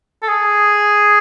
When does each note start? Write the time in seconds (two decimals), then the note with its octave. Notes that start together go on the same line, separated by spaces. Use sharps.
0.22 A4
0.28 G#4